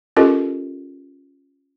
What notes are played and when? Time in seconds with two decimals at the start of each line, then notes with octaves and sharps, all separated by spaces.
0.16 C#4 F4 G4 A4 A#4 D#5